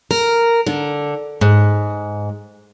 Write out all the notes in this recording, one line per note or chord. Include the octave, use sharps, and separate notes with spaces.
A#4
D3
G#2